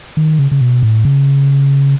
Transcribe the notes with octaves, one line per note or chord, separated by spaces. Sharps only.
D#3
C#3
C#3
B2
A2
C#3